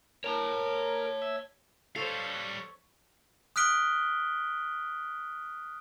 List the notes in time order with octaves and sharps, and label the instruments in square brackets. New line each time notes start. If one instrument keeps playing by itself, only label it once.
[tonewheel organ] A#4 [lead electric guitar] C#5 A5
[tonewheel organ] E5
[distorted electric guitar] G3 F5 [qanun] A4 C5 [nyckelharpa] C#5
[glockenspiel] D#6 F6 F#6 B6 D7 G7